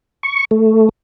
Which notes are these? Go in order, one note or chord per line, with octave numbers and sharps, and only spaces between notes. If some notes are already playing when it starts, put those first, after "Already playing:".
C#6
A3